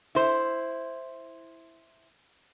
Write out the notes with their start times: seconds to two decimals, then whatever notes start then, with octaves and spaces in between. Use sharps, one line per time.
0.15 E4 C5